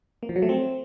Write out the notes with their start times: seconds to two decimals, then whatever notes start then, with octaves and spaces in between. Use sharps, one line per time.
0.23 A#3
0.29 F3
0.36 F#3
0.42 A3
0.49 C4